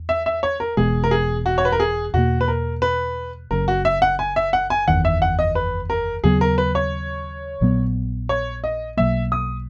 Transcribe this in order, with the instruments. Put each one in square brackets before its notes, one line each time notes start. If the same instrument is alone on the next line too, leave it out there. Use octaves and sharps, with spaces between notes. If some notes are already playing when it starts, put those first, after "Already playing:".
Already playing: [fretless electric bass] E2
[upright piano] E5
E5
C#5
A#4
[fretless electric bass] E1 E2 B2 G#3 [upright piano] G#4
[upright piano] A#4
G#4
F#4
C#5
B4
A#4
G#4
[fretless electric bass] E2 B2 A#3 [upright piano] F#4
[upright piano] B4
A#4
B4
[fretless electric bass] F#1 F#2 C#3 [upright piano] A#4
[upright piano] F#4
E5
F#5
G#5
E5
F#5
G#5
[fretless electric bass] F#1 E2 D#3 [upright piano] F#5
[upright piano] E5
F#5
D#5
B4
A#4
[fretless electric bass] D#2 C#3 F#3 B3 [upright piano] G#4
[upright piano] A#4
B4
C#5
[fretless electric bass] A#1 A#2 F#3 B3
[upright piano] C#5
D#5
[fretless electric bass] B1 B2 F#3 A#3 [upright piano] E5
[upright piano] D#6